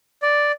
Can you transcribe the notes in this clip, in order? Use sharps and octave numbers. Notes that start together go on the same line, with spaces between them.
D5